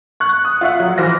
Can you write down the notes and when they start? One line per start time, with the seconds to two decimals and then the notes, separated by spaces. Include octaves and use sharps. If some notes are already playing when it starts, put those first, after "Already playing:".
0.20 C#6 F#6
0.45 D#6
0.61 F4 E5 F#5
0.80 F#3
0.98 E3 C5 F6 A#6